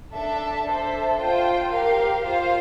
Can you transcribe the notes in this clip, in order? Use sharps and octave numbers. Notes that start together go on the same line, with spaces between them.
D4 A4 E5 A5
D4 A4 C5 E5
F4 C5 G5
G4 A#4 F5
F4 C5 F5